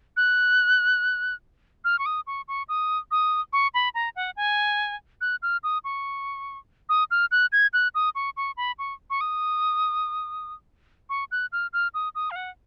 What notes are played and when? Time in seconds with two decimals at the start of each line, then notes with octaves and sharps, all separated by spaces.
0.17 F#6
1.85 F6
1.99 C#6
2.06 D#6
2.27 C#6
2.48 C#6
2.69 D#6
3.11 D#6
3.53 C#6
3.74 B5
3.95 A#5
4.16 F#5
4.37 G#5
5.21 F#6
5.42 F6
5.64 D#6
5.84 C#6
6.89 D#6
7.11 F6
7.31 F#6
7.52 G#6
7.73 F#6
7.95 D#6
8.15 C#6
8.37 C#6
8.57 B5
8.79 C#6
9.10 C#6
9.21 D#6
11.10 C#6
11.31 F#6
11.52 F6
11.73 F6
11.94 D#6
12.15 D#6
12.31 F5
12.36 F#5